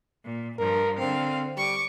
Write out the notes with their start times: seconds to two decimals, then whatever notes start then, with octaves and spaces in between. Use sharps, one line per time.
0.24 A#2
0.59 G2 F3 A#4
0.99 D3 C4 F5
1.57 G3 C#6 D6